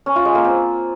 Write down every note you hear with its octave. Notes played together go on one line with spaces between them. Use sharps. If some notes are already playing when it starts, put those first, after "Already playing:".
C#4
F4
G#3
A#3
C4